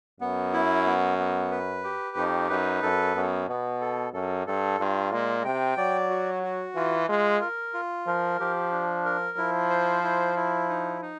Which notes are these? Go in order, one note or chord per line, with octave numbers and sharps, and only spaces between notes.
F#2 B3
E4
B3
B3
B4
G4
F2 D#4
F#2 B4
F#2 A4
F#2 B3
B2 B3
A4
F#2 A4
G2 A4
G2 F4
A#2 G#3
C3 G5
F#3 D5
F#4
F#4
E3 F4
G#3 F4
A#4
F4
F3 A#4
F3 G4
D4
A#4
F3 E4
C5
E4
E4
D#4
D#4